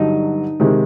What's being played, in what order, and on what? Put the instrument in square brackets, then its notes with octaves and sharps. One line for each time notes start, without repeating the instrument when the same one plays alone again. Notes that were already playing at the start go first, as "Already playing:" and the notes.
Already playing: [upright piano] G2 D3 F#3 [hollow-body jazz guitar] D#4
[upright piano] C3 D#3 G#3